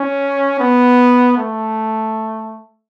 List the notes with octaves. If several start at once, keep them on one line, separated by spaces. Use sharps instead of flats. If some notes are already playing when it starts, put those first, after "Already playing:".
Already playing: C#4
B3
A3